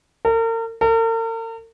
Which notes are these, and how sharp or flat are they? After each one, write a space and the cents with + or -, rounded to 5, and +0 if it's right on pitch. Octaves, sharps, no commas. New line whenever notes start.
A#4 -40
A#4 -45